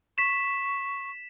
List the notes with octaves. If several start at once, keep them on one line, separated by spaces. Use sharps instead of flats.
C#6 B6 E7